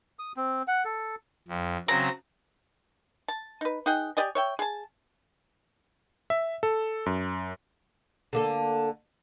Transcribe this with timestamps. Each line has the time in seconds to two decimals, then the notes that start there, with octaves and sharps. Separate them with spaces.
0.19 D#6
0.37 C4
0.68 F#5
0.85 A4
1.48 F2
1.88 C#3 F#3 C4 A#5
3.28 A5
3.61 D#4 B4
3.86 D#4 G#4 F#5 G5
4.17 G4 D5 D#5 G#5
4.35 C#5 E5 G5
4.59 G#4 A5
6.30 E5
6.63 A4
7.06 F#2
8.33 D3 A#3 A4